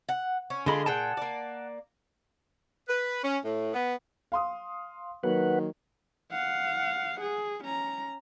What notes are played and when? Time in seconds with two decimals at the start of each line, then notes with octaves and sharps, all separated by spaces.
0.09 F#5
0.50 C#4
0.66 D3 G#3 D4 F4 D#5 B5
0.86 A#2 G#4 F#5 G5 A5
1.17 A#3 D5
2.88 B4
3.24 C#4
3.43 A2
3.74 B3
4.32 F5 C6 D#6
5.24 D#3 F#3 A#3 B4 F#5
6.32 F5 F#5
7.21 G#4
7.64 C#4 A#5